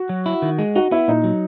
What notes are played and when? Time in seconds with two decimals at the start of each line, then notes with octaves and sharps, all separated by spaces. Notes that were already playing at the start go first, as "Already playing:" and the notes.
Already playing: F#4
0.09 F#3
0.26 E4
0.42 D#3
0.59 G#3
0.75 D#4 F#4
0.91 B3 E4
1.08 A#2 D#4
1.24 F#3